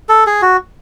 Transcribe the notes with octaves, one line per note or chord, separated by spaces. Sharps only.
A4
G#4
F#4